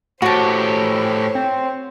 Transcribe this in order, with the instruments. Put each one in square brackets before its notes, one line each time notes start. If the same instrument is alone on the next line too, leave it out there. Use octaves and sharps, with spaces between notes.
[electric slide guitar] A2 G4 [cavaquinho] F#4 A5 [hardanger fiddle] C5 C#5
[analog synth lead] C4